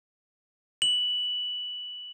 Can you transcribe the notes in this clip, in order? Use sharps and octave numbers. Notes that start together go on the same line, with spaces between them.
F#7